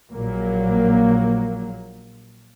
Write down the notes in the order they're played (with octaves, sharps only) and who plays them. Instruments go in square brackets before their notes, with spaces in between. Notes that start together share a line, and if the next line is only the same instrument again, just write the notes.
[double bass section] A#1 A#2 F#3 A#3